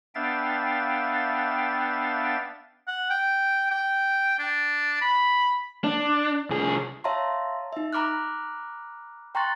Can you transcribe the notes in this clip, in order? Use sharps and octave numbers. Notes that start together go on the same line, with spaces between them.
B3 D4 E5 F5 G5 A6
F#5
G5
G5
D4
B5
D4
C2 G#4
C#5 E5 F5 A5 A#5 C6
D#4 E5
A#5 B5 D6 F6 F#6
G5 A#5 C6 C#6 F#6 A6